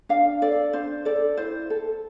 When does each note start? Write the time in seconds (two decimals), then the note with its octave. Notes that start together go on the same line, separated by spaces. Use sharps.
0.09 D4 F5
0.42 A4 D5
0.73 D4 C5
1.05 A4 D5
1.37 E4 C5
1.70 A4